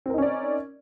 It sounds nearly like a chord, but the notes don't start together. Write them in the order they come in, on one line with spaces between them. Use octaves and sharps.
C4 A#4 D#4 C#4 D5